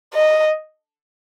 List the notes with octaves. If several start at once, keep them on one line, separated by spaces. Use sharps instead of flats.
D#5